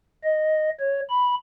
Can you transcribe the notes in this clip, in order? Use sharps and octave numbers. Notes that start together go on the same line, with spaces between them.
D#5
C#5
B5